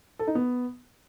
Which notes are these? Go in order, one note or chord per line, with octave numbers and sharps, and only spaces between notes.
A4
D#4
B3